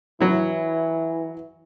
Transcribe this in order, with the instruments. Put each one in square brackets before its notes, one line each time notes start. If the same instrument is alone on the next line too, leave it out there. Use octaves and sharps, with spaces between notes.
[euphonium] E3 [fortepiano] F#3 E4